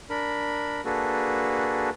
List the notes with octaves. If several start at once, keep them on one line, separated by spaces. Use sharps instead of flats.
D4 A#4 B5
A#3 D4 F#4 G#4 A4 B4